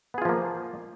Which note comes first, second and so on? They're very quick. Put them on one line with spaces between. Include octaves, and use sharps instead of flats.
B3 G#4 F4 F3 A#3